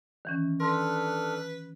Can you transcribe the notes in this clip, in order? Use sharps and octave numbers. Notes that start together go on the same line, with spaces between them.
D#3 E3 C#4
D4 A4 B4 C6 F6